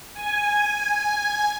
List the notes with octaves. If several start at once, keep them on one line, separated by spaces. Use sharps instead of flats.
G#5